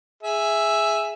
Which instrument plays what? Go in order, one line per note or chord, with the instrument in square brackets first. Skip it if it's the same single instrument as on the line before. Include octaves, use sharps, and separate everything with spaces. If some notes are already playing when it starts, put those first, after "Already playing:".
[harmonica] G#4 E5